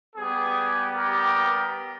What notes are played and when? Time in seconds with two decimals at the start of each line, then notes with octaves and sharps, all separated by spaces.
0.16 G3 B3 G4 G#4
0.95 G4 A#4